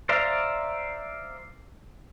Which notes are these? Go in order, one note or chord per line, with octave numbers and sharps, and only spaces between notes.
C5 D5 E5 F5 A#5